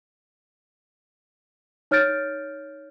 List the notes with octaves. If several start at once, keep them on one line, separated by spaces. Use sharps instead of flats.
D#4 C#5 F6 G6 A6 D7